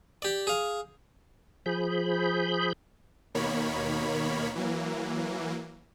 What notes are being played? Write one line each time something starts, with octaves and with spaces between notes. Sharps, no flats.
G4 D5
G#4 F5
F3 G#4 B5 G6
D#2 B2 D#3 A#3 C#5 B5
E3 F#3 A#3